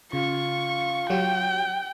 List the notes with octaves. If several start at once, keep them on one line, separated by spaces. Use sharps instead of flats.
C#3 F4 C#6
F#3 F#4 G4 G5